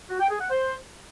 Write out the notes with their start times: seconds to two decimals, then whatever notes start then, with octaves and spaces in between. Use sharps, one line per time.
0.10 F#4
0.20 G5
0.30 G#4
0.40 F#5
0.50 C5